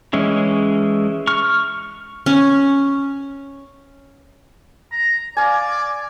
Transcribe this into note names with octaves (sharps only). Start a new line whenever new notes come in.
E3 G#3 C#4 E4
C#6 F6
C#4
A#5
D5 F5 G#5